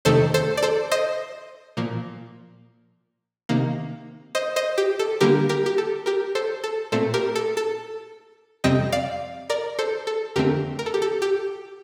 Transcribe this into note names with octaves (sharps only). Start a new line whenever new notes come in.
F2 C3 D#3 A3 A4 C5
A4 C5
D5
A4 C5
C5 D#5
A#2 F3 A#3
C3 D#3 A#3
C5 D#5
C5 D#5
G4
A4
D3 G3 A#3 G4 A#4
G4 A#4
G4
A4
G4 A#4
A4 C5
A4
A#2 A3 C4 A4 C5
G4 A#4
A4
A4
F2 C3 G3 C4 D#5 G5
D5 F5
A#4 D5
A4 C5
A4
F2 D3 A3 C4 G4 A#4
A#4
A4
G4
A4
G4